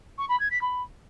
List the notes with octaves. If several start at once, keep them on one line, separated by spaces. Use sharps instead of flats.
C#6
B5
G#6
B6
B5